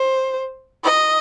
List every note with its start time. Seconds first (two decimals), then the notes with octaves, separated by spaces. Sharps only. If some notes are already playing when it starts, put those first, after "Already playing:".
Already playing: C5
0.84 D#5